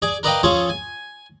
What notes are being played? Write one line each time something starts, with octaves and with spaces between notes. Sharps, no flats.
G#4 D5
A#4 B4 D5 D#5 F5 G5
F3 C#4 F4 G#4 A4
G#5